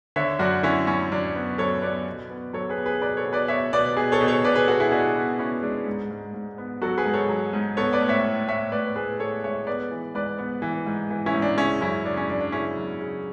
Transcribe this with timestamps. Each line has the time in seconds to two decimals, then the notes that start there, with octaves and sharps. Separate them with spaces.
0.16 D3 C#5 E5
0.39 F#2 D4 F#4
0.63 D3 C#4 E4
0.87 F#2 C#4
1.12 F#2 D4
1.35 B3
1.58 F#2 A4 C#5
1.82 B3 B4 D5
2.07 B2
2.30 B3
2.53 F#3 A4 C#5
2.69 G#4 B4
2.78 B3
2.86 G#4 B4
3.01 B2 B4 D5
3.17 A4 C#5
3.25 B2
3.33 B4 D5
3.48 B2 C#5 E5
3.73 B2 B4 D5
3.96 B2 G#4 B4
4.12 A4 C#5
4.21 B2
4.28 A4 C#5
4.44 B2 B4 D5
4.55 G#4 B4
4.68 B2 F#4 A4
4.80 E4 G#4
4.92 B2 D4 F#4
5.16 B3
5.39 B3 C#4 E4
5.62 G#3 D4
5.87 G#2
6.11 G#2
6.34 G#2
6.58 B3
6.82 F#3 F#4 A4
6.98 G#4 B4
7.06 G#2
7.14 A4 C#5
7.29 F#3
7.53 G#2
7.77 B3 A4 C#5
7.93 B4 D5
8.01 A2
8.09 C#5 E5
8.25 A2
8.48 A2 C#5 E5
8.72 A2 B4 D5
8.96 A2 G#4 B4
9.20 A2 A4 C#5
9.44 G#3 C#5 E5
9.67 B3 B4 D5
9.91 E3
10.14 G#2 B4 D5
10.38 B3
10.62 E3
10.86 G#2
11.10 E3
11.26 C#4 E4
11.34 G#2
11.42 D4
11.57 C#3 C#4 E4
11.81 F#2 C#4 E4
12.05 C#3 D4
12.17 C#4
12.29 F#2 D4
12.41 D4
12.52 C#3 C#4 E4
12.77 F#2
13.01 C#3